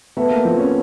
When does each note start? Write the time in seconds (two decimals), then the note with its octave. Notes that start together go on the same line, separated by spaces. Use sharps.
0.17 A3 B3
0.31 A#3
0.45 F3 C4
0.59 C#4